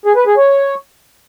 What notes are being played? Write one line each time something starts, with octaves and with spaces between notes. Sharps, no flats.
G#4
B4
G#4
C#5